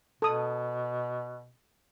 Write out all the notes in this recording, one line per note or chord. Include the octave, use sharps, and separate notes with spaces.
B2 A4 D#6